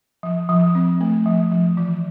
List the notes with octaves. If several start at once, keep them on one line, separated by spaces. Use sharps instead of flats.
F3
F3
C4
A3
F3
F3
E3